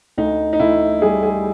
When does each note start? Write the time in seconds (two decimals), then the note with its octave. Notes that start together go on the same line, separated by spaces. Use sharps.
0.18 D2 D#4
0.53 D#4
0.60 D2 E4
1.02 G3 G#4
1.23 G#4